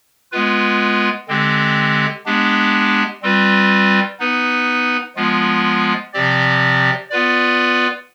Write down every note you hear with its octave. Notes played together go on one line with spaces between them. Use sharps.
G#3 B3 F4 B4
D3 G#3 C4 G4
G#3 B3 D4 G4
G3 C4 F4 B4
B3 D#4 B4
F3 G#3 B3 F4
C3 F3 C4 G4 D5
B3 F4 B4 D5